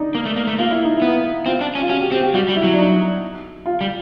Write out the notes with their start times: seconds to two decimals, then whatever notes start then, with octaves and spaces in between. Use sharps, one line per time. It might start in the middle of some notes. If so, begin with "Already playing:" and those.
Already playing: D4 D#4
0.15 A#3
0.26 A3
0.36 A#3
0.47 A3
0.58 A#3 F4
0.71 E4
0.84 D#4
0.97 B3 E4
1.46 C4 F4
1.61 D4
1.75 C#4
1.82 F4
1.89 C#4 F#4
2.01 G4
2.11 C4 G4
2.23 G4
2.34 G3 F#4
2.48 G3
2.56 E4
2.64 F#3
2.74 D4
2.78 D#4
3.66 F4
3.81 G3